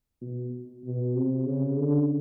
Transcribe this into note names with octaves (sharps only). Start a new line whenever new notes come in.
B2
B2
C3
C#3
D3